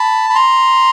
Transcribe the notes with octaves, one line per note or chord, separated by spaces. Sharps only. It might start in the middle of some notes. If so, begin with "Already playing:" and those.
Already playing: A5 B5
B5
A#5 C6